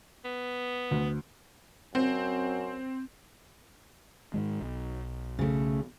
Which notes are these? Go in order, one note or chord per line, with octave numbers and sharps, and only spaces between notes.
B3
D2
F#2 C4
G#2 D#3 G#3
B1
C#3 A3